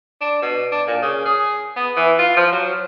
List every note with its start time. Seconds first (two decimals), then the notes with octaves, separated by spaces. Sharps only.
0.21 D4
0.42 B2
0.72 D4
0.87 A#2
1.03 C#3
1.26 G#4
1.76 B3
1.97 E3
2.19 F4
2.36 F3
2.52 F#3